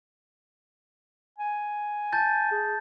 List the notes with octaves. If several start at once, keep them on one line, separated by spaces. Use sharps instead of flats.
G#5
A5 G6 A6
G#4